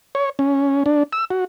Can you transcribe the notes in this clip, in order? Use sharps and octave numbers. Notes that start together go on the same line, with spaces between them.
C#5
C#4
D4
E6
F#4